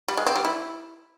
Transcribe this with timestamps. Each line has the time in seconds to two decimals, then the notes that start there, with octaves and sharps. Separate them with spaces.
0.08 G3
0.17 G#3
0.26 C4
0.36 G3
0.45 E4